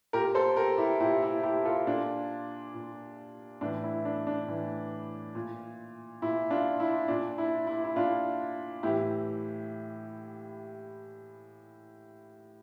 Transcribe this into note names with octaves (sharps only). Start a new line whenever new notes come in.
A#2 G4 A#4
A4 C5
G4 A#4
E4 G4
A#2 E4 G4
E4
E4 G4
F4 A4
A#2 D4 F4
A#2
A2 E3 D4
E4
D4
D4
A2 E3
A#2
A#2 E4
D4 F4
E4
A#2 D4
E4
E4
E4
A#2 D4 F4
A2 E3 E4 G4